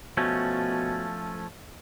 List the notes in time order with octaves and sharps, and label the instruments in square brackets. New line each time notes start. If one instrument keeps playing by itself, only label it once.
[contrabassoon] B2 [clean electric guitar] F3 A3 C#4